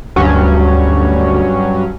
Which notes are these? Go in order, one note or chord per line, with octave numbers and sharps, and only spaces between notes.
D2 G2 F#3 C#4